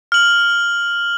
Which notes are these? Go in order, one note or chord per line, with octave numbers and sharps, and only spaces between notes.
F6 F#7